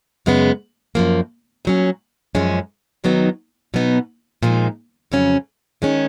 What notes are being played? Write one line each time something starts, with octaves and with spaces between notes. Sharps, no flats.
F#2 C#3 G#3 B3
F#2 F3 A#3
A#2 F#3 C#4
F#2 F3 G#3 C#4
F#2 D#3 F#3 B3 D#4
B2 F#3 B3 D#4
A#2 F3 G#3 D#4
F2 C#3 F#3 C#4
D#3 G#3 C#4